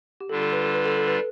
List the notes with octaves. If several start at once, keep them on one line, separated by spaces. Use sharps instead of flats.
G4
D3 G3 D4 F4 A4
A4
B4
A4
B4
A4
A4
B4